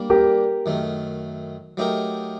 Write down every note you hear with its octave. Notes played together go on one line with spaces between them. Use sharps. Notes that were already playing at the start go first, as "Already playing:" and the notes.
Already playing: G3 A#3 D4
G4 A#4
F#2 D#3 A3
F#3 A3 D#4 G4 A#4